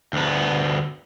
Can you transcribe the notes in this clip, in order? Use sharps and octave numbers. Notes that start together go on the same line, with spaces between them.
D2 B3